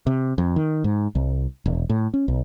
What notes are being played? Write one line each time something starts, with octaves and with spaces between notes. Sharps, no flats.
C3
F2
D#3
G#2
C2
E1
A2
C#4
B1